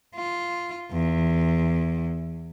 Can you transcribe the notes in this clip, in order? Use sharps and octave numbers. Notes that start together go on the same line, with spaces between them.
F4
E2